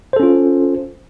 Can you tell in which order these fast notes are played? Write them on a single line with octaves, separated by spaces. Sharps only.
C5 A4 C#4 F4